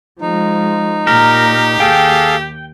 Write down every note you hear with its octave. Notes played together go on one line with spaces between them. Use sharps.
F3 G#3 D#4
A#2 G4 A#4
D#2 G#4 A4 F5 G5